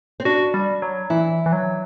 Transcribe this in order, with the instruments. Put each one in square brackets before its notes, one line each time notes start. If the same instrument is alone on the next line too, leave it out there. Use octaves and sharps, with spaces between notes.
[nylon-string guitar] C4
[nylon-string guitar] D4 [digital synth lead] F#4
[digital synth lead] G3
F#3
[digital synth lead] E3 [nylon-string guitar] E4
[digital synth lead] E3
F#3